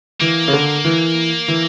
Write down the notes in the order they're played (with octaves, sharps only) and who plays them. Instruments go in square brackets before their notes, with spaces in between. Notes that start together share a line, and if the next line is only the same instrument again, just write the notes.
[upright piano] E3 [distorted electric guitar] A#3
[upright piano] C#3
D3
E3
E3